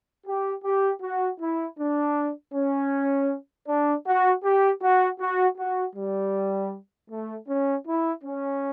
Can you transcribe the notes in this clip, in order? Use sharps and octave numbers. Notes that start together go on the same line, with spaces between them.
G4
G4
F#4
E4
D4
C#4
D4
F#4
G4
F#4
F#4
F#4
G3
A3
C#4
E4
C#4